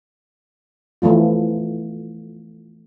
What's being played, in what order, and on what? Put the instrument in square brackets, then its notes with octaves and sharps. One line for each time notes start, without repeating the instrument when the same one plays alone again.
[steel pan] E3 F3 A3 F4